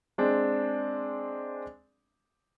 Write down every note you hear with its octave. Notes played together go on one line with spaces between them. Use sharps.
G#3 C4 D4